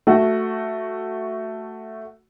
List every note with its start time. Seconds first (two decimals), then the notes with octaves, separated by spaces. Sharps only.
0.07 A3 F#4